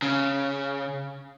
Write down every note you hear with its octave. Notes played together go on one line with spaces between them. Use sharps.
C#3